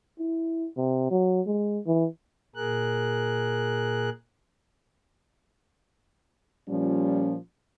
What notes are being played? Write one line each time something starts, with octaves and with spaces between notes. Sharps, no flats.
E4
C3
F#3
G#3
E3
A#2 G#4 A#4 F#6
A#2 F3 G3 C#4